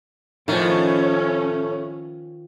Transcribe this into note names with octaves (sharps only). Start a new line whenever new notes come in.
A2 D#3 F3 A3 C#4